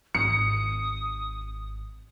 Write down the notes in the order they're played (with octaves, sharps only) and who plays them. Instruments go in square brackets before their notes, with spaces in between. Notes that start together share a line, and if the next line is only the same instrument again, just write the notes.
[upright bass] G#1 [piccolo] D#6 [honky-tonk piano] C#7